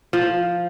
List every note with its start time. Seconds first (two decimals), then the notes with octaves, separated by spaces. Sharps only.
0.13 F3